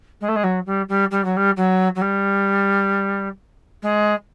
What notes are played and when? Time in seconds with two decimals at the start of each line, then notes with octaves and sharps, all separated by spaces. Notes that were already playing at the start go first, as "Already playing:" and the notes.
0.21 G#3
0.28 A3
0.35 G#3
0.43 F#3
0.66 G3
0.88 G3
1.11 G3
1.24 F#3
1.36 G3
1.56 F#3
1.95 F#3
2.01 G3
3.82 G#3